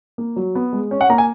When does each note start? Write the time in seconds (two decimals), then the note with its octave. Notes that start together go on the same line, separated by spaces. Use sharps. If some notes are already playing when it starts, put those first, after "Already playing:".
0.18 A#3
0.36 F#3
0.55 B3
0.73 G#3
0.91 C#4
1.01 F#5
1.09 A#3 A#5
1.18 G#5